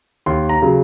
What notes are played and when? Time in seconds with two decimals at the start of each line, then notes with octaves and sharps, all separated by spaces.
0.26 D#2 C6
0.49 A#5
0.62 C#3 F#3